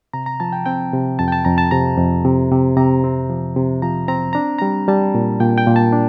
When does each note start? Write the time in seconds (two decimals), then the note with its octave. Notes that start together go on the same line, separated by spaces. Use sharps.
0.14 C3 A#5
0.26 A#5
0.40 F3 A5
0.53 G5
0.66 C4 G5
0.93 C3
1.19 F2 A5
1.28 G5
1.32 A5
1.45 F2 A#5
1.58 A5
1.71 C3 A#5
1.97 F2
2.25 C3
2.51 C3
2.77 C3 A#5
3.04 C4
3.30 F3
3.56 C3
3.82 F3 A#5
4.08 C4 A#5
4.33 D4 A#5
4.59 G3 A#5
4.88 G3 A5
5.15 A#2
5.40 A#2 G5
5.58 G5
5.67 A#2
5.76 A5
5.93 D4